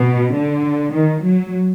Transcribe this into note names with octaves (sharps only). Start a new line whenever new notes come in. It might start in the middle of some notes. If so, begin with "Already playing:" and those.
Already playing: B2
D3
D#3
F#3